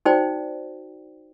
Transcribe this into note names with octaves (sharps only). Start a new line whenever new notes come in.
D#4 F#4 C5 D5 G5